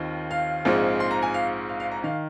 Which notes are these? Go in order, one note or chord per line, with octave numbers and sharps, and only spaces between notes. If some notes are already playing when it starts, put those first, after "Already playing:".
Already playing: D#2 D#3 C4 F4
F5
A#1 G#2 G#3 C4 F4
C6
A#5
G#5
F5
F5
F5
A#5
D#3 F5